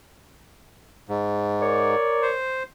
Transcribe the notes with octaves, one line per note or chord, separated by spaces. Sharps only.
G#2
A#4 C#5 D5
C5